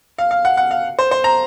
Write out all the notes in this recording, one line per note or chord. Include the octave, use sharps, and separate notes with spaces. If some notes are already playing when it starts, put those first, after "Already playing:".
F5
F5
F#5
F#5
F5
C5
C5
A#5